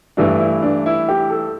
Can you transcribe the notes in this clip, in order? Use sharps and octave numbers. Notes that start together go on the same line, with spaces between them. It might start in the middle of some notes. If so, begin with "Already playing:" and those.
G2 E3 A3 D4
E4
D4
E4
G4
A4